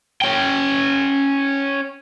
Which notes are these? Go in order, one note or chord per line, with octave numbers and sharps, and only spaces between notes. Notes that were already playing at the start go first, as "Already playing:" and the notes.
C#4 G5